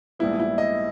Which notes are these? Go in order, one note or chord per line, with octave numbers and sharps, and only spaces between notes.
A#1 G#2 G3 B3 E4
E4
D#5